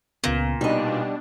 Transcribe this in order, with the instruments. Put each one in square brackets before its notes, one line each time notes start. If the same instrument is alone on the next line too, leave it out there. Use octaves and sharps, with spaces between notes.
[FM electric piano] C#2 C#3 B3 [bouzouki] A#2
[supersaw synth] B2 D4 [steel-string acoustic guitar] G3 D#5 [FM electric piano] D#4